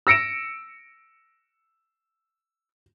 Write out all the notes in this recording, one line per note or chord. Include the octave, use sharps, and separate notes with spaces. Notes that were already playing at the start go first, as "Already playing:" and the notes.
E6 A#6 C#7 D7 E7